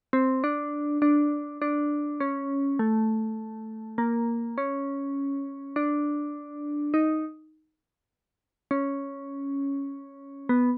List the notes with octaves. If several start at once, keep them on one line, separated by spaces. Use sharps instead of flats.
C4
D4
D4
D4
C#4
A3
A#3
C#4
D4
D#4
C#4
B3